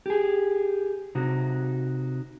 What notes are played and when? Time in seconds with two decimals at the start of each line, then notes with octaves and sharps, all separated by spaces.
0.06 G4 G#4
1.15 C3 D#4 F#4